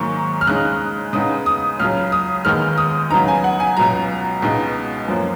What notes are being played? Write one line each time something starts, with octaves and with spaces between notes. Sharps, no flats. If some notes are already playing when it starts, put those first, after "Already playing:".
Already playing: G#2 D#3 F#3 A#3 C#6
F6
C#3 G#3 D#4 F#6
C#3 G#3 B3 D#4 D#6
D#6
C#2 C#3 F#3 F6
D#6
D#2 D#3 G#3 B3 F6
D#6
C#3 F#3 B3 D#4 A#5
G#5
F#5
G#5
C#2 B2 F#3 A#5
C#2 B2 G#3 D#4
F#2 F3 A#3 C#4